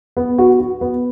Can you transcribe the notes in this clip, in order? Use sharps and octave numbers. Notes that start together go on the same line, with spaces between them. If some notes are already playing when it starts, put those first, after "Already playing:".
B3
F#4
F#4
B3